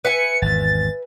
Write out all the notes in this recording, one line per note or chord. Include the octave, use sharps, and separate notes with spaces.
B4 E5 G#5 C#7
G#1 E2 A6